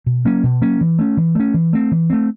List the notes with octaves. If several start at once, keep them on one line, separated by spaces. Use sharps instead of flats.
B2
F#3 A#3 C#4
B2
F#3 A#3 C#4
E3
A3 C#4
E3
A3 C#4
E3
A3 C4
E3
A3 C4